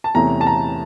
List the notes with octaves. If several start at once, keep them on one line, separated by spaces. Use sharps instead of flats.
A5
E2 C3 E3 A3 C#4 A#5
A5
A#5